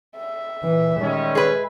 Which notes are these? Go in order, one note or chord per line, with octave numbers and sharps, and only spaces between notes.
E5
A#2 E3
D#3 G3 G#3 C#4
G#4 B4